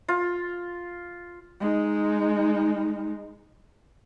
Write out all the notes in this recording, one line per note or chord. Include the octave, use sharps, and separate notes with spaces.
F4
G#3 D#4